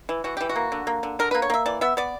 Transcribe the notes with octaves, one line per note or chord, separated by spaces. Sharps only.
E3
E3 F#4
E3 G4
F#4
A#3
D3
A#3
D3
D3 A#4
B4
A#3
C#5
A#3 E5
E3 D5
B3 E5
B3 D5